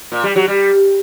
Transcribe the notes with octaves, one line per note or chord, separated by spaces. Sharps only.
A#2
G3
F#3
G3